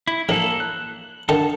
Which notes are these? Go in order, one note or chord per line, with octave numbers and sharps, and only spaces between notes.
E4
A1 A#3 A4
F#6
D3 D#3 A4 A5